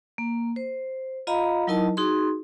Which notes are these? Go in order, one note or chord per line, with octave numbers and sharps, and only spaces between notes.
A#3
C5
F4 D#5 F5 A#5 B5
F#3 D#4 E4 A#4 D#5 A5
D#4 F#4 G#4 C6